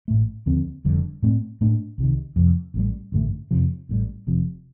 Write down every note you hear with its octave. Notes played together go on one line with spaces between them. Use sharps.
A1 A2 A3
D#2 D3 F3 C4
F1 F2 D3 G3
A2 A3 C4
A2 A3 D4
C2 C3 D#3
F2 C3 F3
A1 A2 G3
A1 G2 D3 A3
F2 C3 F3
A1 A2 G3
F1 F2 C3 F3